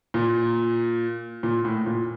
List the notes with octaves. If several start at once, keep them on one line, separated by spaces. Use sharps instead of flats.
A#2
A#2
A2
A#2